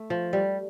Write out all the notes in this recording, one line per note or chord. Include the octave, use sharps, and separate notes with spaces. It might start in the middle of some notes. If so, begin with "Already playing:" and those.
Already playing: A3
F3
G3